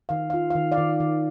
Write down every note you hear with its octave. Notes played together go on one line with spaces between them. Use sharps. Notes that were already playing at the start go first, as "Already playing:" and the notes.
D#3 F5
F4 F5
D#3 F5
D5 F5
D#3
D#3